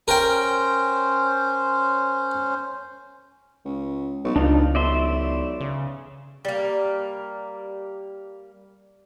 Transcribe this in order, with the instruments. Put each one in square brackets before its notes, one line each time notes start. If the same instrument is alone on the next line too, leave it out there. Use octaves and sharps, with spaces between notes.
[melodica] C#4 C5 [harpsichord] A#4 G5
[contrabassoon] C#2
B1
[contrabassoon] D1 [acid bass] C#2 [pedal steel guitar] D4 D#4 F4
[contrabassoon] B1 [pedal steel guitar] D5 E5 C6
[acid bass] C#3
[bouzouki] G3 A#3